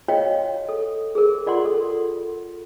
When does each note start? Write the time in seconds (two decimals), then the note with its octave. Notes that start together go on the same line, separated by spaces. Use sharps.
0.08 F#4 C#5 D#5 F5 G5
0.69 A4
1.15 G#4 A#4
1.46 F4 D5 F#5 C6
1.65 A4